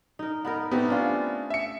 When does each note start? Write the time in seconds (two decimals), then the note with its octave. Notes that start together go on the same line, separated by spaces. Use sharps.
0.19 D#4 A#4
0.45 B3 D#4 A#4
0.71 A3 B3 C4 D#4 G4
0.89 C#4 D4 F4
1.50 E5 C#7